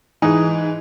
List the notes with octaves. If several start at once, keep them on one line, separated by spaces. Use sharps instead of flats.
G#2 E3 D#4 G#5